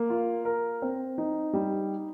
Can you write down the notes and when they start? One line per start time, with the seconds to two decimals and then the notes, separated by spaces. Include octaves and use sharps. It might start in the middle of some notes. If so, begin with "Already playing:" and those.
Already playing: A#3
0.10 F4
0.45 A#4
0.82 C4
1.18 D#4
1.53 G3